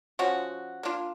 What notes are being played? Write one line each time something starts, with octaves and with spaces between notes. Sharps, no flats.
F3 G#3 C#4 F#4
A#3 D4 F4